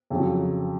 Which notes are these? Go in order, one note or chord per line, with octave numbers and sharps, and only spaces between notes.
F2 C#3 F#3